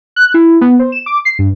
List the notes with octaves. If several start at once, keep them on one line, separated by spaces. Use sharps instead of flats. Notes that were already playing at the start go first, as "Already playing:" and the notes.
F#6
E4
B3
C5
E7
D6
C7
G2